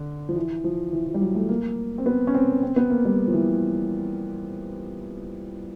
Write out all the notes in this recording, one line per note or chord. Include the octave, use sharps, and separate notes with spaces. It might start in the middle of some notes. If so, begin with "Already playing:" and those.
Already playing: D3
F3
E3
F3
E3
E3
G3
F#3
A3
A#3
C4
B3
C#4
C4
C4
B3
A#3
G3
F3
E3